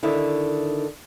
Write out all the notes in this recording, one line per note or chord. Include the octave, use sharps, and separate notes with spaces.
D3 D#3 E4